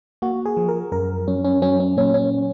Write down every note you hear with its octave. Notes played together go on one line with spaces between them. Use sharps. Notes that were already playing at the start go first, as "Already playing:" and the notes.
A#3 F#4
G#4
F3
A#4
F#2 A#4
F#2 C#4
C#4
F#3 C#4
C#4
A#2 C#4
C#4